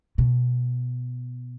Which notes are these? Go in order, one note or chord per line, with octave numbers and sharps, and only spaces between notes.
B2